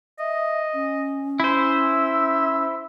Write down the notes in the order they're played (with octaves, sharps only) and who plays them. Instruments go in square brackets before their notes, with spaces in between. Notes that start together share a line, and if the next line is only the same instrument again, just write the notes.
[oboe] D#5 [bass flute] E5
[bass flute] C#4
[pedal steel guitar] E4 C5 [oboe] E5